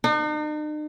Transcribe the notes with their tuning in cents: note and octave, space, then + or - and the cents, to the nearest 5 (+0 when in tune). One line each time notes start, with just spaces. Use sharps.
D#4 -45